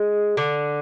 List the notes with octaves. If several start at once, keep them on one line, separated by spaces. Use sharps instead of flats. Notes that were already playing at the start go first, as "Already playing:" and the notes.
Already playing: G#3
D3